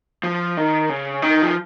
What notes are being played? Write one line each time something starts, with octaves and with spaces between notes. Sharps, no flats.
F3
D#3
C#3
D#3
F3